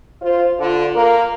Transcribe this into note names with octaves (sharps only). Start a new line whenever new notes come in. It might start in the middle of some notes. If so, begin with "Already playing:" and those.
F4 C5
D3 F4
A#3 A#4